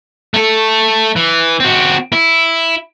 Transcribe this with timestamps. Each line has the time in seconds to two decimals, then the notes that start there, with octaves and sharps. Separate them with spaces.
0.34 A3 A4
1.16 E3
1.60 C4 F#4
2.12 E4